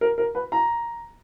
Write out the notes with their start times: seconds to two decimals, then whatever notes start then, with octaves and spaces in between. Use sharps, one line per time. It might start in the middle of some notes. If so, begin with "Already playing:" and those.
0.01 A#4
0.18 A#4
0.35 B4
0.52 A#5